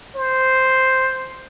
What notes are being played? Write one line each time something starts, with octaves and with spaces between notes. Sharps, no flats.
C5